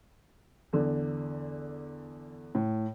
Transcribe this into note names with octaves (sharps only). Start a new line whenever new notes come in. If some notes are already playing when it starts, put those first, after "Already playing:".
E2 D3
A2